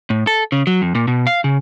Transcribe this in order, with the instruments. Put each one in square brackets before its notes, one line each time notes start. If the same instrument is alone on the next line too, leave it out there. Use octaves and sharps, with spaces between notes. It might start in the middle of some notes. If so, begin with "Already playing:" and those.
[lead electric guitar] A2
A4
C#3
F#3
F2
A#2
B2
F5
C#3